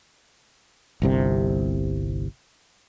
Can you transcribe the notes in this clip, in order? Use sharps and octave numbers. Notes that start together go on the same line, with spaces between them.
G1 C2 C3